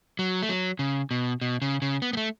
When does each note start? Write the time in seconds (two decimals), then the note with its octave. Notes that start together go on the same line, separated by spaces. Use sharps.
0.19 F#3
0.43 A3
0.49 F#3
0.79 C#3
1.11 B2
1.41 B2
1.62 C#3
1.82 C#3
2.02 B3
2.13 B3
2.17 A3